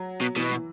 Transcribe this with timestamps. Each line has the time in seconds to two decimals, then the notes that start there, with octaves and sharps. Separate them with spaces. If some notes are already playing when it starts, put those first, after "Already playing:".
Already playing: F#3
0.21 B2
0.36 B2 E3
0.52 E3